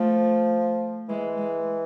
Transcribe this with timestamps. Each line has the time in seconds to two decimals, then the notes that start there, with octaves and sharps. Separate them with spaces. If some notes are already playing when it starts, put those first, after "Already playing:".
Already playing: F3 A3
1.09 E3 G#3
1.38 G#3